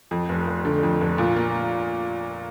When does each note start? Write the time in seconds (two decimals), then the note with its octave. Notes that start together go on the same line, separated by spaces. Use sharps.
0.11 F2
0.29 F1
0.47 F1
0.65 D3
0.83 F2
1.01 F1
1.18 A#2
1.36 A#3